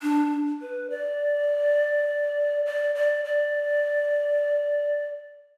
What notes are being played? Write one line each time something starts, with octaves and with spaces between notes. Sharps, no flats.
D4
B4
D5
D5
D5
D5